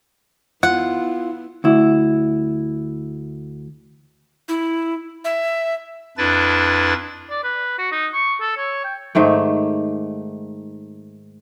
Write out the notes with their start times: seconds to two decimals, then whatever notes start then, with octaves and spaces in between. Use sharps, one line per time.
0.63 B3 E4 F4 F#5
1.64 D2 E4
4.49 E4
5.25 E5
6.18 F2 D4 E4 B4 A6
7.30 D5
7.44 B4
7.79 F#4
7.92 D#4
8.14 C#6
8.41 A4
8.57 C#5
8.84 G5
9.15 G#2 D#3 A3 G5